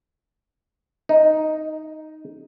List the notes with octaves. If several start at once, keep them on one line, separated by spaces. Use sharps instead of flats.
D#4